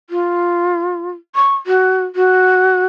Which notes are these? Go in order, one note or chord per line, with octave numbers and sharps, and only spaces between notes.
F4
C#6
F#4
F#4